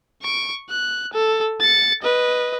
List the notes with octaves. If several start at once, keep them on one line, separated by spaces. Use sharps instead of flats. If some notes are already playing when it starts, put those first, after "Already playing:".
C#6 D7
F#6
A4
A6 C#7
B4 D#5